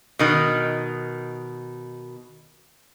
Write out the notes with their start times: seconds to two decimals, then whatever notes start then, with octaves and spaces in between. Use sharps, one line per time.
0.19 B2 D#3